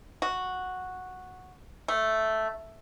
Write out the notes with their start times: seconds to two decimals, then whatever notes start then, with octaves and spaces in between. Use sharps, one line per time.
0.22 F#4
1.88 A3